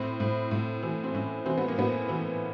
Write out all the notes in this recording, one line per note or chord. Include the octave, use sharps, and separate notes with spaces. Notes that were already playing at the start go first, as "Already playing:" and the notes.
Already playing: A2 C4
A2
A2
E3
C4
A2 C#4
E3 C4
B3
A#3
A2 B3
E3